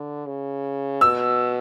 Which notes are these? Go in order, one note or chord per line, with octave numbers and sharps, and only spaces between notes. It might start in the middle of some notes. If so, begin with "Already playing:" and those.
Already playing: D3
C#3
B2 E6